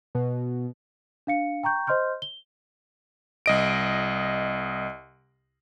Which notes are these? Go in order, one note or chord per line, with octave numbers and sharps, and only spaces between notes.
B2
D4 F5 C#7
G5 A#5 C#6 G6
C5 D#5 C6 F6 G6
G7
C2 D#5 D7